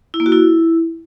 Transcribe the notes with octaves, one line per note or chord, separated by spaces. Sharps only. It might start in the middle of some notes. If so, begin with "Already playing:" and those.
E4
A#3
F#4
E4